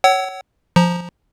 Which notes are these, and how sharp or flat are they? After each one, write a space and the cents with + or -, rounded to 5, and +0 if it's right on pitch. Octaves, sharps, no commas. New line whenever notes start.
C#5 +0 F#5 +35 E6 -5
F3 +0 A#5 +0